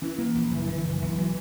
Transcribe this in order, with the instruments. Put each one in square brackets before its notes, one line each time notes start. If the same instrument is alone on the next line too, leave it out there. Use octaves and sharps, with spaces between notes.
[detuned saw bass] E3 [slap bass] C#4
[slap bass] A#3
A#1
[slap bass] F#1 [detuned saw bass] E3
[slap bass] D3
F#1
B1
F#3